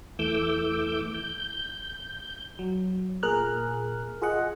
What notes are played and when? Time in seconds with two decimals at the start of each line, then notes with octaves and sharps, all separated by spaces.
0.19 E2 E3 A3 D6 E6 G6
1.14 G6
2.59 F#3
3.23 A#2 G#4 A#4 F6 F#6
4.22 F4 G#4 D#5 F#5